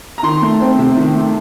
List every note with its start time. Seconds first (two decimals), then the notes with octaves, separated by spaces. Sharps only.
0.18 A#5
0.23 D#3 C6
0.42 A3
0.60 C4
0.78 C3
0.97 D#3
1.15 A3